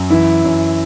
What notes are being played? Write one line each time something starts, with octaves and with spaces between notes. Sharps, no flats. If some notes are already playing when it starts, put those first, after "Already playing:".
Already playing: F#2 F#3
E3 E4
F#2